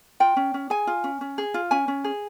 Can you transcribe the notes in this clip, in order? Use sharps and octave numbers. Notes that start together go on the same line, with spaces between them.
F4 G5
C#4
C#4
G#4 G#5
F4
C#4
C#4
G#4
F4
C#4 G#5
C#4
G#4